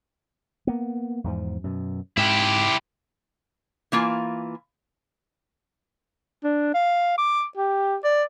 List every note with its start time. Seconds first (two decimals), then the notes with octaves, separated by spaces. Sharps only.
0.67 A#3 B3
1.24 E2 G#2 F3
1.64 F#2 B2
2.17 G#2 E4 G4
3.92 E3 A#3 F4 G#5
6.44 D4
6.74 F5
7.18 D6
7.57 G4
8.04 D5